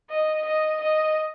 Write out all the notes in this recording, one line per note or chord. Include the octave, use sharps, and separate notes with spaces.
D#5
D#5
D#5